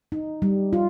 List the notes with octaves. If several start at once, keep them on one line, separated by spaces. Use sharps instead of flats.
D#4
G3
F4